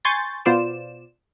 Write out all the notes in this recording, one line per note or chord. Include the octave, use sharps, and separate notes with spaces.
G#5 C6 C#6 G6 A6
B2 B3 F4 C5 D5 E7